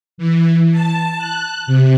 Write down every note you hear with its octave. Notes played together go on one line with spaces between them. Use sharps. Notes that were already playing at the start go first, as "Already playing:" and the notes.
E3
A5
F#6
C3